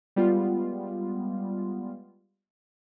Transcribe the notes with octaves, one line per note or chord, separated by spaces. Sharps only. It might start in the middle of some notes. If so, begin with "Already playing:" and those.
G3 G#3 B3 F4